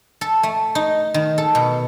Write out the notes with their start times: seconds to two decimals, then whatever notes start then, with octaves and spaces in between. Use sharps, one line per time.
0.21 A4
0.43 A3
0.75 D#4
1.14 D#3
1.38 A4
1.55 B2